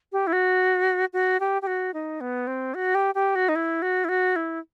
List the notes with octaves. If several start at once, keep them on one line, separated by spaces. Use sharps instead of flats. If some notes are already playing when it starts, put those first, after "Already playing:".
G4
E4
F#4
F#4
G4
G4
F#4
D#4
B3
C4
F#4
G4
G4
F#4
D#4
E4
F#4
E4
F#4
E4